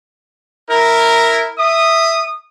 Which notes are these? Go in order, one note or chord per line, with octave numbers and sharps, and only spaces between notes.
E4 A#4
E5 D#6